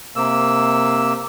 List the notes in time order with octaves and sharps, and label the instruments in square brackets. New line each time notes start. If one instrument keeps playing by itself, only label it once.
[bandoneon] C3 A#3 E6